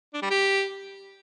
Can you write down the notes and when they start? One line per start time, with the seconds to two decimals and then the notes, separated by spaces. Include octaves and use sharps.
0.14 D4
0.22 G3
0.31 G4